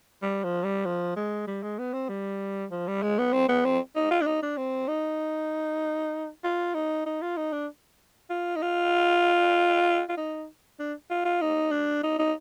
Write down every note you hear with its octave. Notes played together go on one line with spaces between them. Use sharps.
G3
F3
G3
F3
G#3
G3
G#3
B3
C4
G3
F3
G3
G#3
B3
C4
B3
C4
D#4
F4
D4
D#4
D4
C4
D#4
F4
D#4
D#4
F4
D#4
D4
F4
D#4
F4
F4
D#4
D4
F4
F4
D#4
D4
D#4
D#4